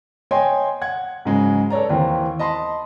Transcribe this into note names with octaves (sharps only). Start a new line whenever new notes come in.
C#5 D#5 G5 G#5 C6
F#5 G#6
G#2 C#3 F#3 G#3
A4 B4 C#5 D5 A#5
D#2 E3 C4
D#5 A5 B5 C6